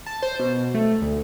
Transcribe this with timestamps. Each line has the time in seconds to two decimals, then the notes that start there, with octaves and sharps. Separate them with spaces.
0.06 A5
0.22 C5
0.39 B2
0.74 A3
1.02 D2